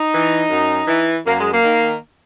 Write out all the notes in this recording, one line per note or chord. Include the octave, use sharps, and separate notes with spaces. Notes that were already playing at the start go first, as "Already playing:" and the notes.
Already playing: D#4
E3
F#2
E3
F#2 A#3
G#3
A#3
D#3